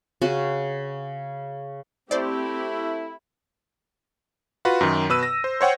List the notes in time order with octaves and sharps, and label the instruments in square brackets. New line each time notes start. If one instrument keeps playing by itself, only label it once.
[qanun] C#3 F#4 G#5
[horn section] A3 E4 [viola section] C4 G4 [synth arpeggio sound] C5 D5
[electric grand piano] F4 F#4 B4
F#2 D#3
B2 B4 E6 D#7
A#6
C5
C5 C#5 F#5 G5